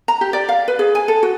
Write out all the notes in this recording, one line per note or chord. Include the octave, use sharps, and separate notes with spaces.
A#5
G4
D5
F5
B4
G#4
G#5
A4
F#4